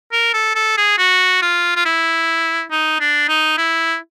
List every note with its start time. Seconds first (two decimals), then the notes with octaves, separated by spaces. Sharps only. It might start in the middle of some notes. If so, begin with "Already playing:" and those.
0.12 A#4
0.34 A4
0.55 A4
0.77 G#4
0.98 F#4
1.42 F4
1.76 F4
1.85 E4
2.71 D#4
3.00 D4
3.28 D#4
3.58 E4